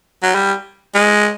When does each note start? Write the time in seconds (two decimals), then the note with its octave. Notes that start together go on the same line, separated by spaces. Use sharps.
0.23 F#3
0.35 G3
0.94 G#3